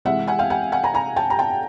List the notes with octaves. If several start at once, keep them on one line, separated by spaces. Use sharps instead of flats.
C3 E3 G#3 E5 F#5
F#5 G#5
F5 G5
F#5 G#5
F#5 G#5
G#5 A#5
G#5 A#5
G5 A5
A#5
G5 A5